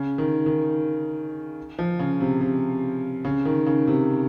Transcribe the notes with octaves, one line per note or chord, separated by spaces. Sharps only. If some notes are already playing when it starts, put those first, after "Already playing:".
Already playing: C#3
D#3
D#3
F3
C#3
C3
C3
C#3
D#3
C#3
C3